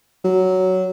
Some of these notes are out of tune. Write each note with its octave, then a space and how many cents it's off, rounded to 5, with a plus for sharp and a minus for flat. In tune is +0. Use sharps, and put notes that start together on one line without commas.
F#3 +10